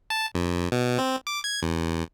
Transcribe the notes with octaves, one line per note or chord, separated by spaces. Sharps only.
A5
F2
B2
C4
D6
G#6
E2